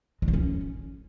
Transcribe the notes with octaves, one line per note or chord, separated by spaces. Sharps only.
G#3
C4
C#4